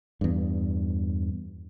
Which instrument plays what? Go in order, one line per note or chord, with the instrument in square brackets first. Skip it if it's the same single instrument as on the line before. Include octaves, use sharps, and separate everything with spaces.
[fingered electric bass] E2 G2